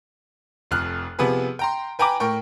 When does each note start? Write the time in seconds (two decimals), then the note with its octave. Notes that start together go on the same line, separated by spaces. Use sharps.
0.71 F1 F2 F6 F#6
1.19 C3 F3 B3 G#4 B4
1.59 G5 A#5 C6
1.99 B4 G5 G#5 A#5 B5 D6
2.20 A2 A#4 G5 C#6